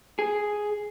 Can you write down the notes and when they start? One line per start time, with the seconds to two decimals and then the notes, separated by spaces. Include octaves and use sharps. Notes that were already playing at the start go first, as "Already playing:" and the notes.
0.19 G#4